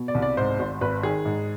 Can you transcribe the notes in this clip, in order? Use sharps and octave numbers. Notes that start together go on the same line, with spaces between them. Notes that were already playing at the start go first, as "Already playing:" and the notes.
Already playing: B2
D5
C2
D5
G#2 C5
G#1
G#1 B4
D#3 G#4
G#2